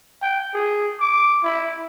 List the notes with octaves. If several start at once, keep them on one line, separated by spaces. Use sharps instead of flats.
G5
G#4
D6
E4